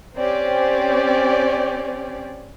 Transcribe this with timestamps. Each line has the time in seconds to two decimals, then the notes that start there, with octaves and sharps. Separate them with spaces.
0.15 C4 C#4 G4 D5